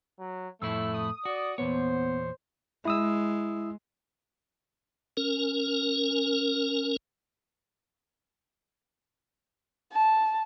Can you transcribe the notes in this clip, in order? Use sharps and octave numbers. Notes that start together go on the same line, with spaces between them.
F#3
F2 A2 A3 E4 E6
D#6
F#4 D5
E2 A#2 B3 C5 C#5
G#3 E4 D#6 E6
C#4 A#4
A5